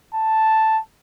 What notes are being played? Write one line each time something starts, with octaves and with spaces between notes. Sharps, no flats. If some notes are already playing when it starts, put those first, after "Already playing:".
A5